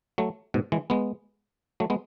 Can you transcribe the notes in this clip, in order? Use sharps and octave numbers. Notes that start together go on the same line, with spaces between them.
F#3 A3
G#2 B2
E3 G#3
G#3 B3
F#3 A3
G#3 B3